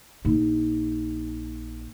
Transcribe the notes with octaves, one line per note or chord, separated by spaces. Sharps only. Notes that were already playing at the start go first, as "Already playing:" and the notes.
A#1 D#4